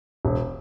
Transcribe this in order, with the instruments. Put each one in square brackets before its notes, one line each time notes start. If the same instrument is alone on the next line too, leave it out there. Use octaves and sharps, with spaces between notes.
[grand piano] E1